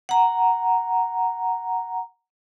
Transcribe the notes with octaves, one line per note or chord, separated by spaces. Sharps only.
F#5 A#5